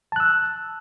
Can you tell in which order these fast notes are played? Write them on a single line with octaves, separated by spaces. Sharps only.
A5 F#6 E6